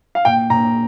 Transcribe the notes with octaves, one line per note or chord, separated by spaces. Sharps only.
F5
A#2 G5
A#2 A#5